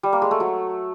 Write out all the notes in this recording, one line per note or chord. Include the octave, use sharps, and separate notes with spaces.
G3
A#3
G#3
A3
F#3